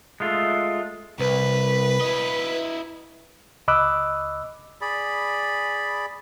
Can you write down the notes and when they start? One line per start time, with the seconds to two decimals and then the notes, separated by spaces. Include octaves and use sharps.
0.20 G#3 A3 F4
1.19 C2 B4
2.01 E4 D#5
3.68 C#2 D#5 B5 D6 E6 F#6
4.81 G#4 D5 B5